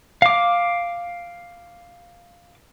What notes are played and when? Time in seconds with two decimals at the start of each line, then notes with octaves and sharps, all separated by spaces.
0.22 F5 D6